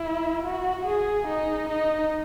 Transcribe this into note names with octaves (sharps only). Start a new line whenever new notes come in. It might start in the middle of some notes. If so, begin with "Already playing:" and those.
Already playing: E4
F#4
G#4
D#4
D#4